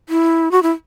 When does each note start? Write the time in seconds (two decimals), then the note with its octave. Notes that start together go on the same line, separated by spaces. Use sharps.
0.09 E4
0.52 F#4
0.63 E4